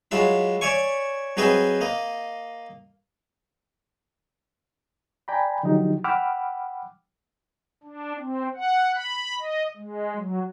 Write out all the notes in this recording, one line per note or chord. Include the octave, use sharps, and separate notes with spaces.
F#3 G#3 F4 E5 B5
C#5 D5 E5 G#5 C#6
F#3 C4 G#4 B4 D#5 E5
A#3 D#5
D5 G5 G#5 A#5 B5
D3 F3 F#3 D#4 G4
F#5 G5 B5 D6 E6 F6
D4
C4
F#5
B5
D#5
G#3
F#3